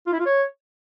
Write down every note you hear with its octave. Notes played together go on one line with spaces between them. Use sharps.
F4
E4
F4
C#5